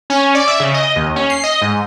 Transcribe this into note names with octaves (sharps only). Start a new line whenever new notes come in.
C#4
D5
E5
C#3
D#5
D#2
C#4
C7
D#5
G#2